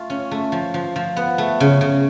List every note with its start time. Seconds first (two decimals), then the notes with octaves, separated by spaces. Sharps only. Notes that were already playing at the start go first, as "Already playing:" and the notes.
Already playing: A3 F4
0.10 C#4
0.31 A3
0.52 F3
0.74 F3
0.96 F3
1.16 B3
1.38 A3
1.60 C#3
1.81 C#3